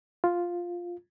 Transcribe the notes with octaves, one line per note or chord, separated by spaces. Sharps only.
F4